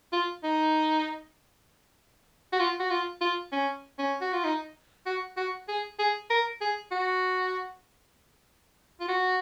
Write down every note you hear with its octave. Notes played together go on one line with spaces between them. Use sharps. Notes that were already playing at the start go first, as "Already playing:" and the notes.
F4
D#4
F#4
F4
F#4
F4
F4
C#4
C#4
F#4
F4
D#4
F#4
F#4
G#4
G#4
A#4
G#4
F#4
F4
F#4